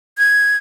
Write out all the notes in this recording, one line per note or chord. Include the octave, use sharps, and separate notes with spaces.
G#6